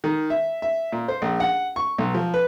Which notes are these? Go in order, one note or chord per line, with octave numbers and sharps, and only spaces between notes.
D#3
E5
E5
A#2
C5
A#1
F#5
C#6
B1
F3
B4